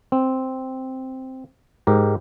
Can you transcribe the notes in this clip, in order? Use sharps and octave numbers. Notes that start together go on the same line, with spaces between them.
C4
G#2 G4 A#4